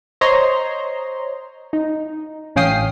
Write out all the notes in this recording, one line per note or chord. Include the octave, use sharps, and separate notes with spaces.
C5 C#5 D#5 A#5 C6
D#4
A1 C#4 F5 G5 D#6 C7